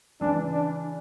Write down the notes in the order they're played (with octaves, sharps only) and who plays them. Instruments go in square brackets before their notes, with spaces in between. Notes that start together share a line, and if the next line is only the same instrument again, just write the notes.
[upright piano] C#3 E3 [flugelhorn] D4
[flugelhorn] D4